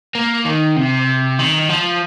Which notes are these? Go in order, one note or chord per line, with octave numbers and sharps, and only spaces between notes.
A#3
D#3
C3
D#3
F3